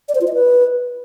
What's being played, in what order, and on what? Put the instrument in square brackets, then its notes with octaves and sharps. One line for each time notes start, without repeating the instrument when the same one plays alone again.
[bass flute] D5
C5
F4
D#5
B4